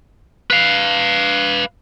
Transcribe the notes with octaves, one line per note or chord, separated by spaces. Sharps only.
B4 F5